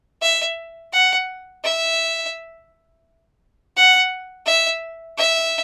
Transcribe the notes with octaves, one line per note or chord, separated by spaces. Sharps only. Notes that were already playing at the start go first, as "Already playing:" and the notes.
E5
F#5
E5
F#5
E5
E5